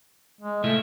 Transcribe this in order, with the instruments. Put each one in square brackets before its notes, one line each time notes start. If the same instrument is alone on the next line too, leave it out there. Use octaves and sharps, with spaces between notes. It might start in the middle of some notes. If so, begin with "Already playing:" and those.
[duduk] G#3
[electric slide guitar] C3 E4 F4 [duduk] A3